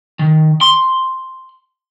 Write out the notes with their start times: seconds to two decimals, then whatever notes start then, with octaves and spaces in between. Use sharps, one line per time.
0.19 D#3
0.61 C6